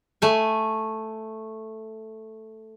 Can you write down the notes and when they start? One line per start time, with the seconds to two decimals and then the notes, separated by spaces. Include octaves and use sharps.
0.22 A3 G#5